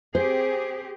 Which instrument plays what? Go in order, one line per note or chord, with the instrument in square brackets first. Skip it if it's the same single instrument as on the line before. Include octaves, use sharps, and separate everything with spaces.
[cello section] C4 G4 G#4 [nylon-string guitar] C5